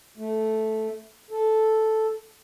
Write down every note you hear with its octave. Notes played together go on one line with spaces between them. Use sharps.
A3
A4